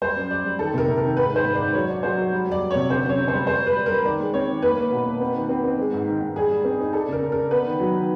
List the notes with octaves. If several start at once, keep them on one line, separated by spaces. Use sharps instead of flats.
G3 C5
F#2
F#2 D5
G3
D#3 A4
C3 A#4
C3
D#3 A#4
G#2 B4
D#3 C5
G#2
G#2 D5
F#3 C#5
D4
F#3 C5
F#3
G3
G3 D5
G3
C3 C#5
D3 C5
F#2 C#5
D3
C5
G3
G3 C5
G3 B4
G3
G3 A#4
D#3 D5
G#3
C4 C#5
D#3
A#3 B4
A#3
B2
A#3
C4
D#3
C4
C4
G#3
G#2
D#3
G#2
G3 G#4
G3
C4
D#4
D4 A4
C#3 A#4
C#3
D4 A#4
B3 B4
D#3
F#3
D#3